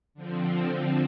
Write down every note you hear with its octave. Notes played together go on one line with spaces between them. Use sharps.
D3 F3 C4